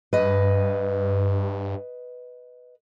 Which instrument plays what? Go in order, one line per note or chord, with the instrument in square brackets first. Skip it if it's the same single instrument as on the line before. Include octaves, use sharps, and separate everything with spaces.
[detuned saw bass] G2 [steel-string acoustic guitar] B4 D#5